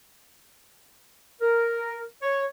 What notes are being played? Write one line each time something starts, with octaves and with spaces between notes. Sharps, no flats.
A#4
C#5